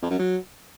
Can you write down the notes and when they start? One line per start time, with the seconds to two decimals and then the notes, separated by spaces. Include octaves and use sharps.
0.02 F2
0.11 F#2
0.19 F#3